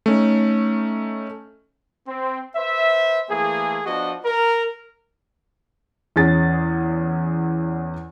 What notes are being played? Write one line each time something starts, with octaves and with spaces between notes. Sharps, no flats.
A3 C#4 D#4
C4
B4 C5 E5
E3 A3 A#3 G#4
F3 B3 D4 F#4 D#5
A#4
E2 C#4 G#4 A6